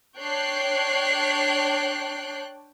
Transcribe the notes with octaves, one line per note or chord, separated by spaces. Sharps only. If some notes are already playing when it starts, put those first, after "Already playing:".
D4 C#5 G5 F#6 G6 C7